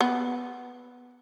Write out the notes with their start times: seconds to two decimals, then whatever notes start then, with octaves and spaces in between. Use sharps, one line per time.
0.01 B3